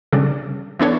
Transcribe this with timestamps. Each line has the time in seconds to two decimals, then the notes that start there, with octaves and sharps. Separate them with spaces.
0.12 C#3 G3 D4 A4 D5
0.79 E3 B3 D4 A4 C#5